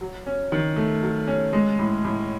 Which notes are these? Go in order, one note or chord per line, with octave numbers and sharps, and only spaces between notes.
F#3
C#4
D#3
A3
F#3
C#4
G#3
A2
A2